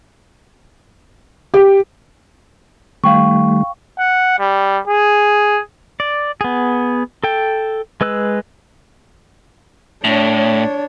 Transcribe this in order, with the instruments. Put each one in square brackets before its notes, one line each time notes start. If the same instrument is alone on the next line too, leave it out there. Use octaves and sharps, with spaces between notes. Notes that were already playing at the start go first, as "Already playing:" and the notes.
[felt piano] G4
[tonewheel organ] D#3 G3 A3 [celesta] F5 G5 C#6
[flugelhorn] F#5
G3
G#4
[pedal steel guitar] D5
B3 G#4
A4 G5
G#3 B4 E6 F#6
[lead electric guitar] A2 [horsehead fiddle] D4 C#5